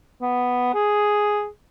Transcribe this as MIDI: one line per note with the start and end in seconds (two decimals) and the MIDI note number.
0.22 0.72 59
0.74 1.47 68